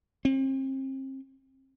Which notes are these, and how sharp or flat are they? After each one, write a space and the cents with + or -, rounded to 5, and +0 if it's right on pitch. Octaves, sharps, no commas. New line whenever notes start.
C4 +35